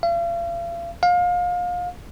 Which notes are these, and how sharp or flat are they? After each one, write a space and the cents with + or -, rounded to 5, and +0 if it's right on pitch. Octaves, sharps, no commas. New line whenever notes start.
F5 -40
F5 +30